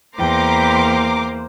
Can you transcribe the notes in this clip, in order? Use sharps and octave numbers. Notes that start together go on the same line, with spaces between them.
E2 A#3 C5 G5 A#5 C6 D6